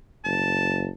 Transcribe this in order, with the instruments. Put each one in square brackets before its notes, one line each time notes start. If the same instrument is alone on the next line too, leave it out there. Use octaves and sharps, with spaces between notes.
[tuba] F#1 [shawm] A5